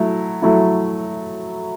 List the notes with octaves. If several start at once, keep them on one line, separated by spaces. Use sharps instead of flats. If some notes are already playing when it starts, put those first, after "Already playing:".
Already playing: F#3 A3 E4
F#3 A3 E4